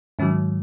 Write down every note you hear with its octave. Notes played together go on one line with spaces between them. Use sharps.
G#2 D#3 F#3 C#4